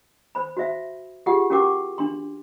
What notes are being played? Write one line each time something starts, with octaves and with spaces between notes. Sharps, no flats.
C5 B5
F#4 C5 E5 F5
F4 G4 G#4 F#5
C#4 F#4 G4 A#4 F#5 D6
D4 C6